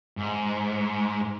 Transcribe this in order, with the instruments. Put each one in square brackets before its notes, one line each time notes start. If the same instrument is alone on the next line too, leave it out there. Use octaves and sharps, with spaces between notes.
[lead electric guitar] G#2